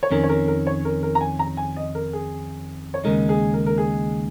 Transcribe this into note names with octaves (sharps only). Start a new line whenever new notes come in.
C#5
F2 D#3 C#4 A#4
C#5
A#4
A#4
C#5
A#4
A#4
A#5
G#5
A#5
G#5
D#5
A#4
G#4
C#5
D#2 C#3 G#3 D#4 A#4
G#4
A#4
A#4
G#4